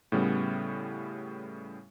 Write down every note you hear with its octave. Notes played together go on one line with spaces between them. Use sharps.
A2 C#3 G3 B3